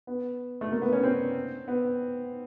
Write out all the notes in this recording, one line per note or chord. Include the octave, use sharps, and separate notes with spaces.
B3
A3
A#3
B3
C#4
C4
B3